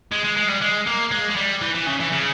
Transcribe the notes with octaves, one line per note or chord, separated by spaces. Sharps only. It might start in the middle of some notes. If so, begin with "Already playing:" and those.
G#3
G#3
G#3
G3
G#3
A#3
G#3
G#3
G3
E3
E3
C#3
E3
C#3